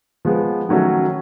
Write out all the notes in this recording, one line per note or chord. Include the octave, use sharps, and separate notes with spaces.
F3 G#3 B3
D#3 F#3 A3 C#4 F#4